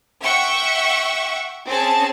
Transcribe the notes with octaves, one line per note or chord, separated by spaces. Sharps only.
E5 F#5 G5 C#6
C4 C#4 G#4 A5